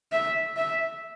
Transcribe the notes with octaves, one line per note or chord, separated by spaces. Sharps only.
E5
E5